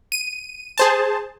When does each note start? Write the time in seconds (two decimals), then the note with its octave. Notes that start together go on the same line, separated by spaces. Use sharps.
0.12 D#7
0.78 G#4 C5 A5